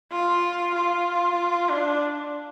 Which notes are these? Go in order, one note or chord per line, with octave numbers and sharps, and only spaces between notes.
F4
F4
D4